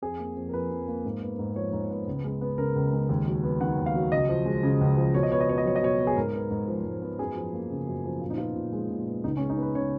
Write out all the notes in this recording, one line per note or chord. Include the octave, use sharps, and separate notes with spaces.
F2 G#4
A#3
F2
A#4
F3 B4
F2
A#3
G#2
B3
G#2
F3 C#5
G#2
B3
C#2
G#3
B3
C#3 A#4
C#2
G#3
D#2
F#3
B3
D#3 F#5
D#2
F5
F#3
C#2 D#5
F3
G#3
C#3
C#2
F3
B2 C#5
D#5
B3 C#5
D#5
B2 C#5
D#5
F#3 C#5
D#5
B2 C#5
B3
G#4
G#2 A#4
B3
G#2
F3
G#2
B3
F#2 G#4
F3
A#3
C#3
F#2
F3
A#2 F4
D#4
B3 F4
A#2
G#3
A#2
B3
C#2 D#4
C#4
G#3
D#4
B3 B4
C#3 C#5